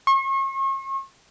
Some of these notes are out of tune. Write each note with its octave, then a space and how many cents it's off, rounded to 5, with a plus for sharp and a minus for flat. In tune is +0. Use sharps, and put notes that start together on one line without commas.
C#6 -40